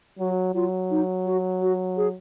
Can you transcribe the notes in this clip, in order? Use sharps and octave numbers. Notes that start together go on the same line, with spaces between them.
F#3 F#4
F#3 F4
D#4
F#4
F#4
G#4